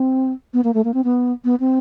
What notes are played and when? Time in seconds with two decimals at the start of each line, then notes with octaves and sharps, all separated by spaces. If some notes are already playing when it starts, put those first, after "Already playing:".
Already playing: C4
0.54 B3
0.64 A#3
0.74 A3
0.84 A#3
0.94 C4
1.04 B3
1.45 B3
1.60 C4